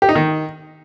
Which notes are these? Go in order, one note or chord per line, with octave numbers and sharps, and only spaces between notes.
G4
D#4
D#3